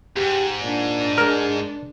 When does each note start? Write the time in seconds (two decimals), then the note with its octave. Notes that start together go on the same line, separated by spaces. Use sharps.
0.17 E2 G#2 G4
0.62 A#2 D4
1.18 G#3 A#4